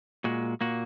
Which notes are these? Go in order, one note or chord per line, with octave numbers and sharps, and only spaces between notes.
A#2 G#3 F#4
A#2 A#3 F#4